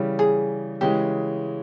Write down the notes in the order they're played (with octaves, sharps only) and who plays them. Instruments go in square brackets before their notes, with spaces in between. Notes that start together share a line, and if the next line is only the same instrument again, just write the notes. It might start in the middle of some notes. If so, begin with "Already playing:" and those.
Already playing: [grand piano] C#3 E3 G3
[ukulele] G#4
[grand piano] C#3 E3 G#3 [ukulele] G4